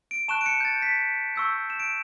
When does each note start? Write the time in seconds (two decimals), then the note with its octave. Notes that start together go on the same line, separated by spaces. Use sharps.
0.11 D7
0.28 A5 C#6 F#6 E7
0.41 D7
0.46 C#7
0.61 G6
0.65 A6
0.82 B6
1.36 C#6 E6 G6
1.70 E7
1.80 D7